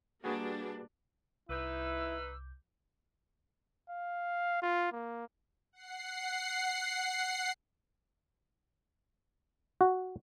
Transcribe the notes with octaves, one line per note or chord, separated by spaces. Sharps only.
G3 A#3 D4 F#4 G#4 B4
C2 D#4 E4 B4 D6 E6 G6
F5
F4
A#3
F#5 C7
F#4